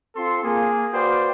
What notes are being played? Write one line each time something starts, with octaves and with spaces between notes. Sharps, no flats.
C4 F4 A4 C6
A#3 G#4
F#4 B4 C5 D5 F5 G5